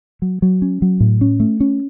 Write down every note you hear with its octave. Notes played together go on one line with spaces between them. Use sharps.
F#3
F#3
C#4
F#3
A2
C#4
A3
C#4